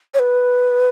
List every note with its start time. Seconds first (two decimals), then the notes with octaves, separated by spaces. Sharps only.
0.14 C#5
0.19 B4